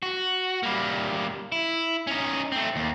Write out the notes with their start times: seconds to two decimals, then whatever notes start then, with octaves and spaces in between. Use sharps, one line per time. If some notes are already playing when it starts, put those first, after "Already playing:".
0.03 F#4
0.63 G3 A#3
1.52 E4
2.07 C#4 D#4
2.52 A3 C4
2.76 D#2